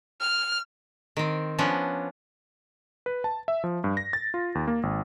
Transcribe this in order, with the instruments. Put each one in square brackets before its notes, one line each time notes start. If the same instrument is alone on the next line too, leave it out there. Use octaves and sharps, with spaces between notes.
[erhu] F6
[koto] D#3 C4
F3 B3 C#4 D4
[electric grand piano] B4
A5
E5
F3
G2
A#6
A6
F4
D#2
A#3
G#1